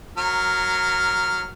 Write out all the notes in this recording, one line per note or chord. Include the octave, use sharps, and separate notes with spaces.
F#3 A#4 F6